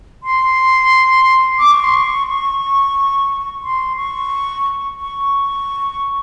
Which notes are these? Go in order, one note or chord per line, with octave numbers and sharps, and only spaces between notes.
C6
D6
C#6
C6
C#6
C#6
C6
C#6
C#6